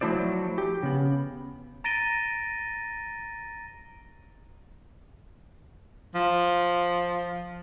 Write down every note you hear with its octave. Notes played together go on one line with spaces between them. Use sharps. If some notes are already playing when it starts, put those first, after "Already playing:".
F3 F#3 A3 E4 C5 D5
G4
C#3 B3
A#5 A6 A#6 D7 D#7 G7
F3